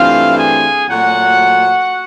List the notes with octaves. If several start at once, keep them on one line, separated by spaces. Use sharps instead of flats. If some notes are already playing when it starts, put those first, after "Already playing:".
Already playing: G2 E3 A3 C4 F4 F5
G#4 G#5
A#2 F#3 A3 F#4 F#5